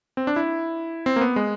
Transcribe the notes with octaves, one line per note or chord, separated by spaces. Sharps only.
C4
D4
E4
C4
A#3
B3
G#3